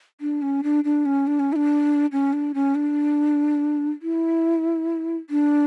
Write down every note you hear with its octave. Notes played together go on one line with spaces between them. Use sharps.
D4
C#4
D4
D4
C#4
D4
C#4
E4
D4
C#4
D4
C#4
D4
E4
D4